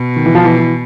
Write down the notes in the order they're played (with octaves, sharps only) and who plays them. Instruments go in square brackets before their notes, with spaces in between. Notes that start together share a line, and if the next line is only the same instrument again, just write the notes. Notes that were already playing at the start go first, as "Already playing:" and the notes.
Already playing: [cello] B2
[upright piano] D#3
E3
F3
E3
E3